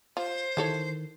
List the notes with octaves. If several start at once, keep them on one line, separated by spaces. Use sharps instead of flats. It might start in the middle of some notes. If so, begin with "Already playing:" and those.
F4 C5
D#3 E4 A4 C#5